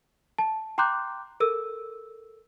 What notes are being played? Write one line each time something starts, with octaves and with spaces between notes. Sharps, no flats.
A5
G5 A#5 C6 D6 F#6 G6
A4 A#4 E6